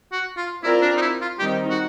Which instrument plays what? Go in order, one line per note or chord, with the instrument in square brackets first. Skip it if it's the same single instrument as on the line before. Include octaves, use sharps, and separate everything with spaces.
[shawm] F#4
F4
[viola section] C4 F4 A#4 D5 [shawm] E4
[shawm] D4
D#4
E4
F4
[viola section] D#3 G3 C4 D#4 [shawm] G4
[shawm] F#4